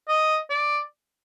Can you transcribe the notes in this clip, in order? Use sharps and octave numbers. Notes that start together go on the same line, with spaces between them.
D#5
D5